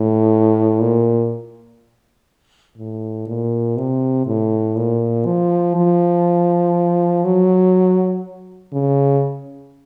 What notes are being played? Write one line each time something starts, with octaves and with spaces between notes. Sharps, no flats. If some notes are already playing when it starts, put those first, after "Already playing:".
Already playing: A2
A#2
A2
A#2
C3
A2
A#2
F3
F3
F#3
C#3